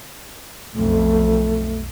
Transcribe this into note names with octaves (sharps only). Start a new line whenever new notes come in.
B1 F2 A3